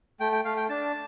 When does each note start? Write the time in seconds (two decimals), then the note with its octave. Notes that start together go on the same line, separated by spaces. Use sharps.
0.20 A3 G5
0.32 G5
0.45 A3 F5
0.57 G5
0.69 D4 A5